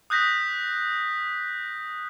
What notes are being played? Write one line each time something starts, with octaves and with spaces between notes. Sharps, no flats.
D#6 F#6 G6 A#6 B6